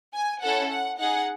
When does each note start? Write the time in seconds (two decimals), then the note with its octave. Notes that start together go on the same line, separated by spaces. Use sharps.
0.14 G#5
0.42 C#4 E4 A4 F#5
0.71 F#5
0.99 D#4 G#4 F#5